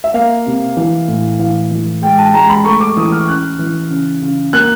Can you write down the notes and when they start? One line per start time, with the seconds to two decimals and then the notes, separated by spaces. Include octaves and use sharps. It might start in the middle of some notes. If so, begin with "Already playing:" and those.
0.04 E5
0.14 A#3 F5
0.46 C3
0.77 E3
1.08 A2
1.39 E3 F5
1.71 E3
2.02 G#3 G5
2.18 A5
2.34 G#3 A#5
2.50 B5
2.65 A3 C#6
2.80 D6
2.97 E3 D#6
3.12 F6
3.28 C#4 F#6
3.59 E3
3.90 C#3
4.22 C#3
4.53 A#3 F#6